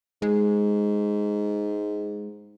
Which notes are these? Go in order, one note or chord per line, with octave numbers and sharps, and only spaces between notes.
G#2 G#3